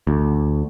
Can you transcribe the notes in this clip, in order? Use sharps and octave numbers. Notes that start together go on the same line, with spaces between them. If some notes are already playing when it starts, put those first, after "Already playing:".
D2